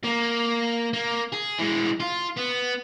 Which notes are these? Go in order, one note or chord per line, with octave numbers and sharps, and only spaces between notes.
A#3
A#3
G#4
E3 G#3
F4
B3